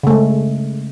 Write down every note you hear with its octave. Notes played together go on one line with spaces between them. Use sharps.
C#3 G#3 A3